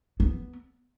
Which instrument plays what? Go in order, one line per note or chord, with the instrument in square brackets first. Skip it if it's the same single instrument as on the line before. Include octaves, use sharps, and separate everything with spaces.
[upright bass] B3